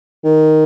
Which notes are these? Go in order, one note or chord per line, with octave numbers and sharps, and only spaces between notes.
D#3